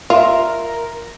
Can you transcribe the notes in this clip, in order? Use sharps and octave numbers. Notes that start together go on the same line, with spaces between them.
F4 A#4 E5